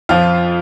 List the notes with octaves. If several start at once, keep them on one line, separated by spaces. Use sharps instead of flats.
F2 F3 F4 F5